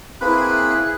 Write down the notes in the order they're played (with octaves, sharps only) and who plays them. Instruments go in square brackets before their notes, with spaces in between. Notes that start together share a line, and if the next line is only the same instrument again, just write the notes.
[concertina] A#3 C4 B5 [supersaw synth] E4 G#4 [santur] B4 [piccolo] F#6